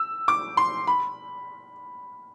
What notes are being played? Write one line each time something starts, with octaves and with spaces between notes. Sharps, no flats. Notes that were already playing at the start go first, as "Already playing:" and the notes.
Already playing: E6
D6
C6
B5